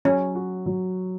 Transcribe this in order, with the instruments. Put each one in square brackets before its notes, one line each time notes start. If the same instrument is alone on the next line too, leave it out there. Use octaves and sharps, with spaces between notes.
[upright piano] F#3 [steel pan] C#4
[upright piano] F#4
F#3